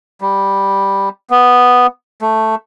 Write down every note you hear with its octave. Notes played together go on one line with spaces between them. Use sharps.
G3
B3
A3